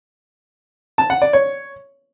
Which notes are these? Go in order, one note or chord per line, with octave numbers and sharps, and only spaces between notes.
A5
F#5
D5
C#5